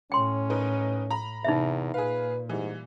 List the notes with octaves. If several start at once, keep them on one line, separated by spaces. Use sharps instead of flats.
A2 C#4 G5 C6
D#4 A#4 B4
A#5 B5
E2 C3 D#4 E5
A#2 G#4 B4 F5
G#2 E3 G3